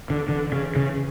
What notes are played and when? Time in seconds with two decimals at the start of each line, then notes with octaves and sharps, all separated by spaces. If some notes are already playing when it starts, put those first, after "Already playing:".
0.10 D3 E3
0.28 D3 E3
0.52 C#3
0.76 C#3